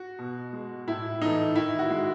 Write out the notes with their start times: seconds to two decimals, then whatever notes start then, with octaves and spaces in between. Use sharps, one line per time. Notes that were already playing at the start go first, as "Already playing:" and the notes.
Already playing: F#4
0.19 B2
0.53 G#3
0.88 A2 E4
1.22 E3 A3 D#4
1.55 D#3 E4
1.79 F#4
1.90 G#3